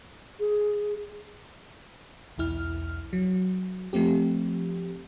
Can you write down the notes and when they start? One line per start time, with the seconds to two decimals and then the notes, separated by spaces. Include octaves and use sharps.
0.40 G#4
2.38 B1 E2 E4 F6
3.13 F#3
3.93 F3 A3 C4 G4